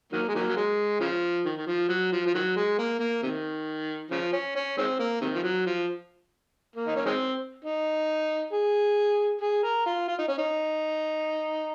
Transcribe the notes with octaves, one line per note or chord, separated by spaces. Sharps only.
D#3 F#3 A#3
G#3
D#3 F#3 A#3
F#3
G#3
C#3 F3
D#3
D#3
F3
F#3
F3
F3
D#3 F#3
G#3
A#3
A#3
C3 D#3
C#3 F3
C#4
C#4
D#3 G#3 C4
A#3
C3 D#3
F3
F#3
F3
A#3
D#4
C#4
D#3 G#3 C4
D#4
G#4
G#4
A#4
F4
F4
D#4
C#4
D#4